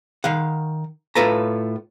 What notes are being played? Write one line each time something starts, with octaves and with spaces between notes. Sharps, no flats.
D#3 F5 F#5
A2 F4 A4 B4 A5 A#5